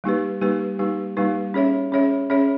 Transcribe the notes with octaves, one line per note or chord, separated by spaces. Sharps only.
G3 A#3 D#4 G4 B4
G3 A#3 D#4 G4 B4
G3 A#3 D#4 G4 B4
G3 A#3 D#4 G4 B4
C#4 G#4 C#5 E5
C#4 G#4 C#5 E5
C#4 G#4 C#5 E5